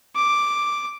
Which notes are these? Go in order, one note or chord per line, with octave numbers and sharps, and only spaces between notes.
D6